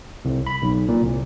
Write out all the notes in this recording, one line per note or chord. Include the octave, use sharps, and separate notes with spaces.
C2
B5
B1
A#2
C2